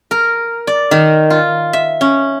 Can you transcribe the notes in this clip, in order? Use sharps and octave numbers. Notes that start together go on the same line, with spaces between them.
A#4
D5
D#3
F4
E5
C#4